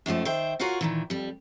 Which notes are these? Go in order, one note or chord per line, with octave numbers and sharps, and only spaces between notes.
F#2 D#3 F3 A3
D#3 C5 E5 G5
F4 F#4 A#4 C#5 F5 F#5
A#2 D#3 E3
F2 G3